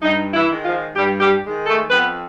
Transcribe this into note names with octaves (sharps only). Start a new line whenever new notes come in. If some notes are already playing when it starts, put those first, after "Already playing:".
G2 D#4
E3 E4
D#3 G#3
F3 F4
G2 G3 G4
G3 G4
D#3 G#3
A3 A4
F2 B3 B4